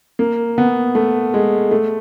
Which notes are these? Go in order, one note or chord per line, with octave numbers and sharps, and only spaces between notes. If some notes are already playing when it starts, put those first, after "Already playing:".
A#3
B3
A3
G#3
A3